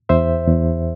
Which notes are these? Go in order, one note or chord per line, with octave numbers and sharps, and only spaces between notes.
E2 C5 E5
E2